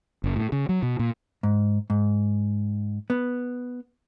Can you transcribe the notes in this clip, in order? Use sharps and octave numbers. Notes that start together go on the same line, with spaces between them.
F#1
A2
C#3
F#3
B2
A#2
G#2
G#2
B3